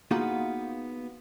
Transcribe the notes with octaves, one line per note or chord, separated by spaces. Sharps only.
A#3 B3 D#4 F4 F#4 G#4